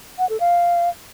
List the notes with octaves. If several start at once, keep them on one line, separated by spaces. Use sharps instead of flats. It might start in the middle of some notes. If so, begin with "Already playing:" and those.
F#5
A4
F5